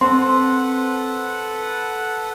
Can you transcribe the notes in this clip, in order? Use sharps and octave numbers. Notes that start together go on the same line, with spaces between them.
C4 A4 B4 F#5 C6